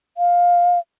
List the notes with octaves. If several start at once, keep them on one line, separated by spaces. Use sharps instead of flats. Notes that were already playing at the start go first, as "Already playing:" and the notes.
F5